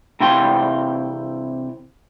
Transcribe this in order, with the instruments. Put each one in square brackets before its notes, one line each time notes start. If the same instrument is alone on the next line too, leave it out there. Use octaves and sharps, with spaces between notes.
[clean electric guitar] C3 E3 C4 F5 G5 C6